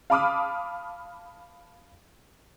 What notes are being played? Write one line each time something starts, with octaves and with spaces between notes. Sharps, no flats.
F5 A5 B5 D6 D#6 F6